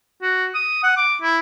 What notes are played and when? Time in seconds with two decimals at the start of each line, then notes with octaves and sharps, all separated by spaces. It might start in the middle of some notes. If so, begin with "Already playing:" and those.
0.22 F#4
0.55 D#6
0.83 F#5
0.97 D6
1.22 E4